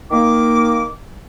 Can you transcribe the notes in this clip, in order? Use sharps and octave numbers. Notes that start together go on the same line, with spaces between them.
D#3 A#3 D6